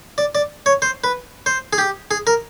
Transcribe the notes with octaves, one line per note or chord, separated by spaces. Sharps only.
D5
D5
C#5
C5
B4
C5
G#4
G4
G#4
A#4